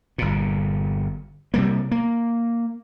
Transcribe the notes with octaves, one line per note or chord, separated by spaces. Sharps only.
G1 A#2
C3 G3 A#3
A#3